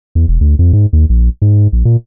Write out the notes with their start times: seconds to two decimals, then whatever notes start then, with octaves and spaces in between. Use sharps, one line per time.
0.15 E2
0.28 E1
0.41 D2
0.59 F2
0.73 G#2
0.93 D#2
1.09 A#1
1.42 G#2
1.72 A#1
1.85 A#2